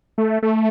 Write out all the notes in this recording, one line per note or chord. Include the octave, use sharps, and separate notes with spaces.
A3
A3